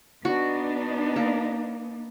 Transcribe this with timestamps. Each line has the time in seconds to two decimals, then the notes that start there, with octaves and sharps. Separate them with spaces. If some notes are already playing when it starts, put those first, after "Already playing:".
0.25 B3 D4 D#4 F#4
1.16 A#3